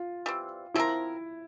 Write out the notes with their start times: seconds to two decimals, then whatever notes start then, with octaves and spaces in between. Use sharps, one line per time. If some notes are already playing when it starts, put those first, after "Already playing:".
Already playing: F4
0.26 E3 G3 C4
0.74 F3 C4 E4 G4 A#4